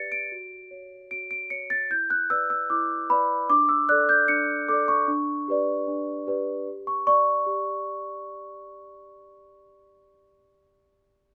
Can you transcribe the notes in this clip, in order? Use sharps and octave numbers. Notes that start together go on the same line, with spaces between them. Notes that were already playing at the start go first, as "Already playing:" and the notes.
Already playing: G4 B4 D5 A6 C#7
D7
F#4
C#5
F#4 D7
D7
C#5 C#7
A6
E4 G6
F#6
B4 D5 E6
E6
E4 D6
B4 D5 B5
D4 D6
E6
A4 D5 F#6
G6
D4 C#7
A4 D5 D6
C#6
D4
G4 B4 D5
D4
G4 B4 D5
G4
C#6
D5 C#6
G4